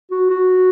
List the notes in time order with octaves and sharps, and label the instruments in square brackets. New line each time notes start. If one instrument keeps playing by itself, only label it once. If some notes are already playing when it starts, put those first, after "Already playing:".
[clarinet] F#4
F#4